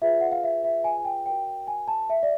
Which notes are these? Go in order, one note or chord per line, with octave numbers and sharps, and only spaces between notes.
F4 G#4 B4 E5
F#5
F5
E5
E5
G#5
G#5
G5
F#4 A#4 C#5 G5
G5
G#5
A5
E5
D5